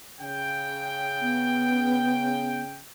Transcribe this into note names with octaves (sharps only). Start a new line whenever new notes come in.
C#3 G5
B3